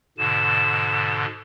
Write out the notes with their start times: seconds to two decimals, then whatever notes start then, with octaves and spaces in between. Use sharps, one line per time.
0.18 G#2 B2 D3 E7